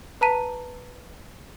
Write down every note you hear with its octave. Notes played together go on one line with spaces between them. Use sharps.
B4 A5 A#5 B6 D#7